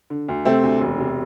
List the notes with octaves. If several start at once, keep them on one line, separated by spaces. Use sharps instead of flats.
D3
D2
C3 A3 C4
D2
E1
C3